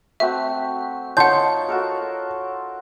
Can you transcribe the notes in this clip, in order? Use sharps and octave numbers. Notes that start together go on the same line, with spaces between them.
A3 C4 F#4 E5
D#4 F4 C#5 F#5 A5 C6 C#6 G6
F#4 A4 A#4